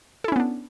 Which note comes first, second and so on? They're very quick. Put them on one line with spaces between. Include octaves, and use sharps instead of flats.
A4 E4 C#4 B3 D4